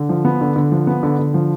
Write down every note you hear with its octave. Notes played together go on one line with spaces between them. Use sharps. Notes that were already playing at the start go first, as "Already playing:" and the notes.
Already playing: D3
F3
B3
D3
D3
F3
B3
D3
D3
F3